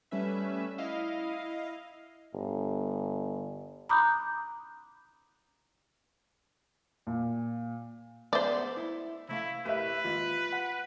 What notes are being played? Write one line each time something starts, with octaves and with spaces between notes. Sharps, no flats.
G3 A3 C#4 B4 E5
E4 D#5 F5
G1
A#5 B5 D6 D#6 F#6 G6
A#2
G#3 A3 B3 C5 D5 E5
E4
C3 A3 E4 F5
A2 A3 G4 A#4 B4 E5
D#2 G#2 F4
F#5